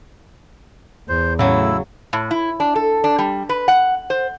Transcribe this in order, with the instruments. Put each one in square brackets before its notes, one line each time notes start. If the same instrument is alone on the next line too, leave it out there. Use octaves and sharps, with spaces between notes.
[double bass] E2 [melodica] C5
[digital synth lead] A2 [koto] C#3 F#3 [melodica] E4 E6
[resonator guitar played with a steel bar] A2
E4
D4
A4
D4
G3
B4
F#5
C5